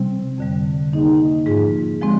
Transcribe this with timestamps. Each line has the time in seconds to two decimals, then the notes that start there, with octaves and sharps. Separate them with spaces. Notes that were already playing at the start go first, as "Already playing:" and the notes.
Already playing: C3 G3 C4
0.38 F2 D3 G3
0.92 D#3 A#3 D#4 G#4 D#5
1.46 G#2 F3 A#3 F4 G#4
2.01 D3 F3 G#3 C4 G4